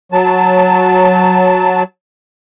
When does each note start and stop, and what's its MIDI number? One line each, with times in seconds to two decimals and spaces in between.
0.12 1.83 54
0.12 1.83 81